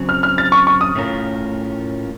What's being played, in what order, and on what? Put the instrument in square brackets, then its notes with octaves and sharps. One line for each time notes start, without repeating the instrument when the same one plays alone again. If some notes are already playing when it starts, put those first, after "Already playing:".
Already playing: [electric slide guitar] C#3 F#3 C4
[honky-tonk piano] F6
F6
A6
C#6
C#6
D#6
[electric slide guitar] A2 A3 C#4 F4 A#4